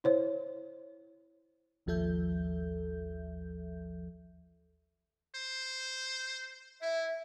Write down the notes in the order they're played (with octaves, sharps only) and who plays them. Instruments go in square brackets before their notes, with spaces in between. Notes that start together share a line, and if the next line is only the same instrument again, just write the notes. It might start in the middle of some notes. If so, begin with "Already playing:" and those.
[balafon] E4 C5 C#5
[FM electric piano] A1 D#2 F3 A4 E5 G6
[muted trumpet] C5
[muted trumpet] E4 [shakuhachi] E5